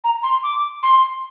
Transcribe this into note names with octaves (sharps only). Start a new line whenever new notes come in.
A#5
C6
D6
C6